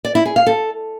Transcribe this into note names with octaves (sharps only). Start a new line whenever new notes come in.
D5
E4
G#4
F5
A4